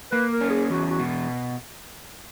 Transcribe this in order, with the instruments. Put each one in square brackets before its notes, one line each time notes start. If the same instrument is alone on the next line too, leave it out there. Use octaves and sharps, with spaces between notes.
[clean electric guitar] A#3 [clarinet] B4
[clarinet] A#4
[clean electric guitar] C#4
[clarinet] G#4
[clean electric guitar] E2 [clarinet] F#4
[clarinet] F#4
[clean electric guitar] B2